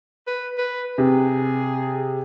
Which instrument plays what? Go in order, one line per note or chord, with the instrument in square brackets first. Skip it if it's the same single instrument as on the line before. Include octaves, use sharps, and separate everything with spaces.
[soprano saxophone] B4
B4
[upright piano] C3 [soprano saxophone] G#4